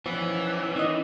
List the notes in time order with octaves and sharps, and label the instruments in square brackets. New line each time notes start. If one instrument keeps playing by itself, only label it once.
[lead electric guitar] E3 [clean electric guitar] F3 [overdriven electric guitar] B3 C#4
[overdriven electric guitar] D#3 [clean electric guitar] C#4 D#5